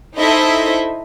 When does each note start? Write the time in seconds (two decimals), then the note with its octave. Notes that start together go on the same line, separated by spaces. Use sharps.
0.16 D#4 E4 A4 C5 D#5 E5